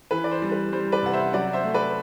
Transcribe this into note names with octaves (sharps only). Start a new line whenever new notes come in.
E3 B4
D5
C5
G3
B4
G3 C5
B4 D5
C3 F#5
C5 E5
F#3 D5 F#5
C5 E5
A3
B4 D5